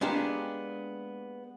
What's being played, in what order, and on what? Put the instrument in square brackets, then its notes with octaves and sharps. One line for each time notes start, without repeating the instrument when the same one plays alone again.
[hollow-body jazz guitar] G#3 A#3 B3 D4 G4